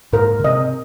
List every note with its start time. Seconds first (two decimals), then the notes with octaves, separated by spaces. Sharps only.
0.13 G#2 A#4
0.40 C#3
0.44 C3 D#5